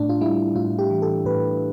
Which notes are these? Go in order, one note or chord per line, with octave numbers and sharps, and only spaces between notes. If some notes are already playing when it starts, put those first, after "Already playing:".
Already playing: A2 D4
F4
G3 E4
A2 F4
G4
E3
A4
A2 B4